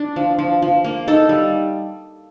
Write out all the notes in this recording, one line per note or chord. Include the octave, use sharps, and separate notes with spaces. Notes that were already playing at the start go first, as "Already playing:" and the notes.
Already playing: D4
F3
F3
F3
A#3
D#4 A4
G3